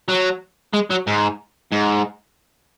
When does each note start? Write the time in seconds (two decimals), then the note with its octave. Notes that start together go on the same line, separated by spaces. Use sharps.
0.09 F#3
0.74 G#3
0.91 F#3
1.07 G#2
1.72 G#2